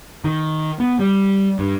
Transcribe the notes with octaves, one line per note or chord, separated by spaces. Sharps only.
D#3
B3
G3
G2